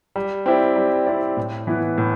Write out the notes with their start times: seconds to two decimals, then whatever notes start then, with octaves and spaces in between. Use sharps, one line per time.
0.16 G3
0.46 C4 E4 G4 D5
0.76 G3
1.07 C4 E4 G4 D5
1.37 A2
1.67 E3 B3 E4
1.98 A2